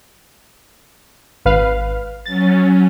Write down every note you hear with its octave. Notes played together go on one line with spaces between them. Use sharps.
G#1 B4 F5
F#3 C#4 A6